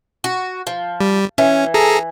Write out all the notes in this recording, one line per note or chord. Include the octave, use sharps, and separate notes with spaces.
F#4
F3
G3
E3 C#4
G#4 A4 A#5